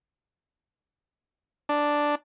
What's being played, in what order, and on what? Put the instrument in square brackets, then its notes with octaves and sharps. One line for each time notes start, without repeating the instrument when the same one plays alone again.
[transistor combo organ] D4